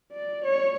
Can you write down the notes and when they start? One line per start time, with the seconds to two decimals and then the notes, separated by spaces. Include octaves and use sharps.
0.12 D5
0.45 C#5